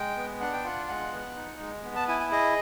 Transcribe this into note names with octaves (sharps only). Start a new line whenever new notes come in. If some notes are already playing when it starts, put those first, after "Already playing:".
Already playing: G#3 G5
B3
D4 F#5
G5
F4 F#5
G#3 F#5
B3
D#4
G#3
B3
A5
E4 G#5
G#5
G#4 D#5